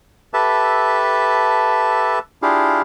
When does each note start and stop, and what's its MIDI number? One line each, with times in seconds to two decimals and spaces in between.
0.34 2.19 67
0.34 2.19 69
0.34 2.19 71
0.34 2.19 76
0.34 2.19 81
2.42 2.82 62
2.42 2.82 64
2.42 2.82 65
2.42 2.82 67
2.42 2.82 68
2.42 2.82 77